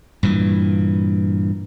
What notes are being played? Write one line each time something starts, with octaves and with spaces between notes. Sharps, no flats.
G2 A#2 E3